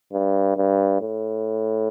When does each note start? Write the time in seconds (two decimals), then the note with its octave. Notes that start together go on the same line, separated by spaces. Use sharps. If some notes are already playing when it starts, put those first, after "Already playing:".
0.13 G2
0.57 G2
1.01 A2